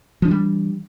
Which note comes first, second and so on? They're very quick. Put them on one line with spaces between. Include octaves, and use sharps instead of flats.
F3 D4 E3 G3